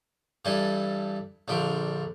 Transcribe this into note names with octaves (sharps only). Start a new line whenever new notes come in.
G2 E3 G3 A4 G#5
A#1 D3 F3 D4 G4